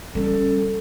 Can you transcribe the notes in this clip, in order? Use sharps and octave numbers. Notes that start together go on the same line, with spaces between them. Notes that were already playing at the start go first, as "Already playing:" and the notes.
G3 C#4 A4